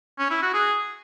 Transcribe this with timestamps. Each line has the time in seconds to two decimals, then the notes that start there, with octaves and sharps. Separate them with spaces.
0.19 C#4
0.30 E4
0.42 F#4
0.54 G#4